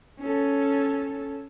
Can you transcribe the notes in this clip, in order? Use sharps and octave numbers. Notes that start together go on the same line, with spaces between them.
C#4 A4